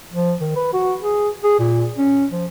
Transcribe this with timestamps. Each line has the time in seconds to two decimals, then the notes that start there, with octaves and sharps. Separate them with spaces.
0.13 F3
0.40 D#3
0.55 B4
0.73 F#4
1.02 G#4
1.44 G#4
1.59 A#2
1.98 C#4
2.30 F3